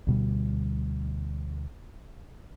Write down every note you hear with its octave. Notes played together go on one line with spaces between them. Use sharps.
D2 B2 G3